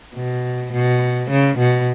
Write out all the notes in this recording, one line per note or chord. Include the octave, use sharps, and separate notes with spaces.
B2
B2
C#3
B2